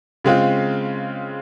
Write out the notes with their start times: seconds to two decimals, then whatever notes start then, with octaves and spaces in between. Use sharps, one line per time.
0.24 C#3 G#3 C4 F4